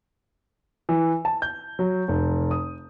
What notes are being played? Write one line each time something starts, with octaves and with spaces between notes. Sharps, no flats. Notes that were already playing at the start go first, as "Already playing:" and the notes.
E3
A5
G6
F#3
F1
D#6